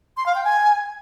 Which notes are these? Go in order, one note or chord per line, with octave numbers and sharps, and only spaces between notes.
C6
F5
G5
G#5